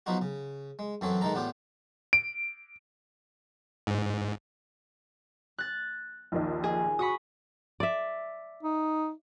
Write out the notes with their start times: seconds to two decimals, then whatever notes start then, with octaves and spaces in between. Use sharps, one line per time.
0.06 F3 F#3 B3 D#4 F4 F#4
0.22 C#3
0.79 G#3
1.01 F#2 E3 F#3 C4 A4 C#5
1.21 D#3 E3 G#3 D#4 A4 A#5
1.34 A2 B3 D4 F4 G4
2.13 D7
3.87 G#2
5.58 F#6 A6
6.32 A#1 D#2 D#4
6.64 G#4
6.99 F#4 B5 C#6 D#6
7.80 D5 E5
8.63 D#4